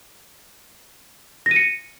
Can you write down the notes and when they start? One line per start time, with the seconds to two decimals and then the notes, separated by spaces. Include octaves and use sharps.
1.46 A#6
1.51 D#7
1.56 C#7